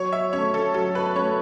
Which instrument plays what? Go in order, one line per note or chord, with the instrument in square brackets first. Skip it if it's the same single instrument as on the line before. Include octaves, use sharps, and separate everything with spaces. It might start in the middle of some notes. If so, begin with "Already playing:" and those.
Already playing: [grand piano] F#3 [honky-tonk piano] C#5
[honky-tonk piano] E5
[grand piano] A3 C#4 [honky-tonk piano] C#5
[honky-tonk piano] A4
[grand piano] F#3 [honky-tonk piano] A4
[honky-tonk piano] B4
[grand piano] A3 C#4 [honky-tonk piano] C#5